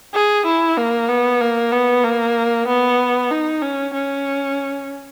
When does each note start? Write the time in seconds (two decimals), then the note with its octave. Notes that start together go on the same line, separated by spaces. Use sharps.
0.14 G#4
0.46 E4
0.77 A#3
1.09 B3
1.40 A#3
1.72 B3
2.04 A#3
2.67 B3
3.31 D#4
3.62 C#4
3.94 C#4